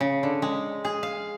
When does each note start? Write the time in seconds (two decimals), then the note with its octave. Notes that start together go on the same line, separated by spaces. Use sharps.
0.01 C#3
0.23 D3
0.42 G#3
0.85 G#4
1.03 F5